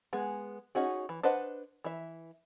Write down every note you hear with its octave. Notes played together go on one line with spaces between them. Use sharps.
G#3 B3 G#4
C#4 D#4 F#4 G#4
E3
D4 B4 C5 D#5 F#5
E3 E5